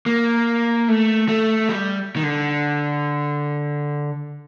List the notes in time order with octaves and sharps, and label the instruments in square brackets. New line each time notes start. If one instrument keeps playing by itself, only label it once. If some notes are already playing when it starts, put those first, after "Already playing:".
[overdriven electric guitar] A#3
A3
A3
G3
D#3
D3